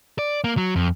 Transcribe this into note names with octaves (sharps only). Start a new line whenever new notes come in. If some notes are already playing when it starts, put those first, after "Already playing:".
D5
A#3
F#3
F2